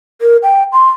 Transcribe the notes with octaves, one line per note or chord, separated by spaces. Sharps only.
A#4
G5
C6